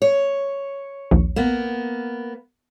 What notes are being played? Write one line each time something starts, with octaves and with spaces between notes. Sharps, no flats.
C#5
A#1 D#2
A#3 B3